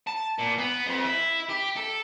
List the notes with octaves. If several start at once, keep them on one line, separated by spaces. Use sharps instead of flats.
A5
A#2
B3
F2
E4
G4
A4